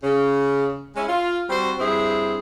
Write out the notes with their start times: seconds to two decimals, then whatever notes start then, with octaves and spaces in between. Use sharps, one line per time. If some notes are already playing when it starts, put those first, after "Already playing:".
0.04 C#3
0.96 G#3 C#4 E4
1.08 F4
1.50 G3 C4 F#4 C5
1.79 G2 C4 E4 G#4